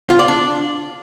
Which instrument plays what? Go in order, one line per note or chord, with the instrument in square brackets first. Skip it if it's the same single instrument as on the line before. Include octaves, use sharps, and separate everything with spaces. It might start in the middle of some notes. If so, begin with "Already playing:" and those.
[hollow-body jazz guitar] F4
D5
D4